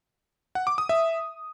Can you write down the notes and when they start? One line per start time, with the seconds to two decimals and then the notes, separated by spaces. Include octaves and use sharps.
0.55 F#5
0.67 D6
0.78 D#6
0.89 E5